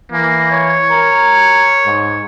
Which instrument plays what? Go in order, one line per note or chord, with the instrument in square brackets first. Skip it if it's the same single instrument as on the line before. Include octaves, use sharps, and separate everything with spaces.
[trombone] E3 [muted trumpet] A#3
[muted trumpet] C#5
[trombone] A#4
G#2